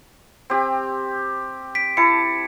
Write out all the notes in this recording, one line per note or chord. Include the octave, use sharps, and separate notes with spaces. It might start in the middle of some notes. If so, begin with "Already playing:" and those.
C4 G4
B6 D7
E4 A5 C#7